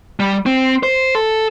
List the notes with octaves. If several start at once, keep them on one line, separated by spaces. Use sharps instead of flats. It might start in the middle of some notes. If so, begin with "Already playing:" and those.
G3
C4
C5
A4